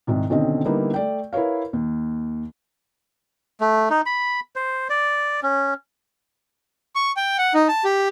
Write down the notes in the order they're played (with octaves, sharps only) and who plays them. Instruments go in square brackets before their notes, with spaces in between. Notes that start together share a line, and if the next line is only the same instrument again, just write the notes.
[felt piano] C2 G#2 D#3
B1 D3 D#3 C4 C#4 D#5
D3 G3 A#3 B3 D#4 E4
A3 D5 G5
E4 A#4 B4 C#5 F5
D#2
[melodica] A3
D#4
B5
C5
D5
C#4
[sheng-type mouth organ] C#6
G5
F#5
D#4
A5
G4